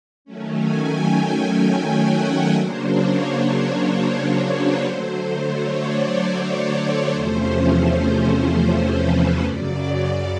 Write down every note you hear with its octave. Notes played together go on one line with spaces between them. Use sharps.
D#3 F#3 A3 C#4
G#5
G5
G#5
G5
F#5
C#3 F#3 A#3 D4 C5
C#5
C5
B4
D3 F#3 A3 C5
C#5
D5
C#5
C#5
E2 C3 F3 A3 C#4 C5
B4
C5
F#2 C#3 F#3 D5